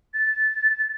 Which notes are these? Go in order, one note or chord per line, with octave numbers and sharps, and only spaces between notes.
A6